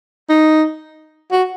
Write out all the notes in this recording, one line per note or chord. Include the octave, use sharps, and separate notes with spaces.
D#4
F#4